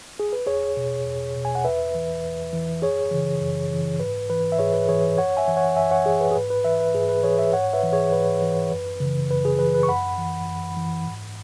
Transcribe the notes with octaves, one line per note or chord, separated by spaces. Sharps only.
G#4
B4
E2 G#4 C#5
B2
E2
B2
G#5
F#5
E2 B4 E5
E3
E2
E3
F#2 G#4 C#5
C#3 E3
F#2
C#3 E3
G#2 B4
E3 B4
E5
G#2 G#4 C#5
B4
E3 G#4 C#5
F#2 C#5 F#5
E5 G#5
E3
C#5 F#5
F#2 E5 G#5
C#5 F#5
E3 G#4
B4
G#4
G#2 B4
B4
E3 B4 E5
B4
G#2 G#4
B4
E3 G#4 C#5
B4 E5
G#2 C#5 F#5
B4 E5
E3
G#4 C#5
G#2 B4
E3
F#2
C#3
E3
F#2 B4
G#4
C#3 E3 B4
B4
C#6
F#2 F#5 B5
E3
F#2
E3
G#2